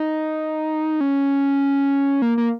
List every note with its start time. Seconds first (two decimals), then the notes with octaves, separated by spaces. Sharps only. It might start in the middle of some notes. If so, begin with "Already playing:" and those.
Already playing: D#4
1.01 C#4
2.22 A#3
2.38 A#3